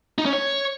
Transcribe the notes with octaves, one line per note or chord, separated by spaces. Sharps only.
D#4
C#4
C#5